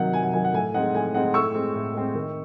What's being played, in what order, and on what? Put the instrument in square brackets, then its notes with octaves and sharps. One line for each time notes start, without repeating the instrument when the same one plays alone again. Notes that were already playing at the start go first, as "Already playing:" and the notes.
Already playing: [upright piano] C3 D#3 F#3 F#5
C3 G#5
F#5
D#3 F#3 G#5
F#5
A2 G#5
G#3 C4 D#4 F#5
A2 G#5
G#3 C4 D#4 F#5
A2 C#6 E6
G#3 C4
A2
G#3 C4
D#3